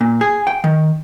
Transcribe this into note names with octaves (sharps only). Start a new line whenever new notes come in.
A#2
G#4
G5
D#3